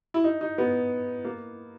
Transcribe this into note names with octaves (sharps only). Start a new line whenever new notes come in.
E4
D#4
D#4
B3
A#3